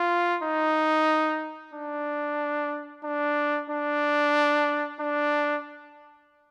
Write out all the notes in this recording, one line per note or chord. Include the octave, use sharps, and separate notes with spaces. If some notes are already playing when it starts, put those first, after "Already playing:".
Already playing: F4
D#4
D4
D4
D4
D4